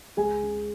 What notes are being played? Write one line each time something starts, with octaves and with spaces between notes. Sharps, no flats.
C#2 G#4 G#5
C#3